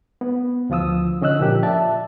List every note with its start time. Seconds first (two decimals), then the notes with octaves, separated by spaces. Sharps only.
0.21 B3
0.70 D2 F3 F4 D#6 E6
1.22 D3 C#4 D#5 E6 F#6
1.40 A#2 F3 A#3 G4
1.63 D5 E5 A5